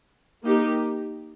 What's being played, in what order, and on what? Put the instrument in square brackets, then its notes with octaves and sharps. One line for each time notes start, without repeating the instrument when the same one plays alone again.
[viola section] A#3 D#4 G4